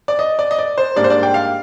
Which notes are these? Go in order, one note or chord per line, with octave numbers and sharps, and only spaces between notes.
D5
D#5
D5
D#5
D5
C5
G#2 G3 A#3 D4 D5
C5
D5
G5
F5